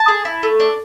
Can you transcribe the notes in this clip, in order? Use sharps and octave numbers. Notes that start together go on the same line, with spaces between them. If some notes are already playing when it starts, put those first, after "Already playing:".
Already playing: A5
G#4
E4
A3
D4